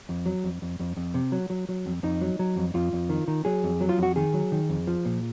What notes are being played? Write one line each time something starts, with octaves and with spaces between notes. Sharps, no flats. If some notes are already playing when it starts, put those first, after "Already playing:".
F2
F#3
F2
F2
F2
F2
C3
F#3
F#3
F#3
F2
F2 D#4
F#3
F#3
F2
F2 F4
F2
D#3
D#3
F#3 G#4
F2
F#3
F4
F2 F#4
D#3 G#4
F#3
D#3
F2
F3
A#2